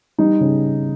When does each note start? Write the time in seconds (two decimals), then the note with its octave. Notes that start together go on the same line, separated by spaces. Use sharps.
0.18 G3 D#4
0.41 C#3